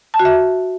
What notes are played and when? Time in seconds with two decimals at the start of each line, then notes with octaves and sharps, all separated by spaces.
0.14 A5
0.19 F#4
0.25 E5